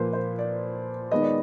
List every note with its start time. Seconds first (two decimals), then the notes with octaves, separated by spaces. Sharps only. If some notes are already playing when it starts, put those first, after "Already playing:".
Already playing: A#2 F3 A#3 B4 C5
0.13 C5
0.39 D5
1.11 D#3 G#3 B3 D#5
1.22 D5